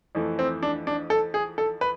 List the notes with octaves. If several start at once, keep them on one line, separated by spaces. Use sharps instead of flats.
F2 E3 A3
C4
D4
D4
A4
G#4
A4
B4